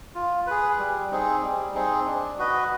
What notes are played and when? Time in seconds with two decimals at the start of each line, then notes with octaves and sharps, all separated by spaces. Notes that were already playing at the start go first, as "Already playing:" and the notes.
0.15 F4
0.47 G#4 B4
0.79 G3
1.11 C4 D#4 G#4
1.43 G3
1.74 C4 D#4 G#4
2.06 D4
2.39 F#4 B4 D#5